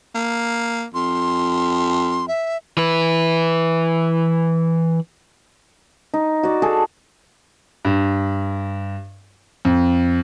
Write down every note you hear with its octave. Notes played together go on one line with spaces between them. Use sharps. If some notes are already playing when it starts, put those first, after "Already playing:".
A#3
F2 C6
E5
E3 B4
D#4
F#4 D5
G#4 A4
G2
F2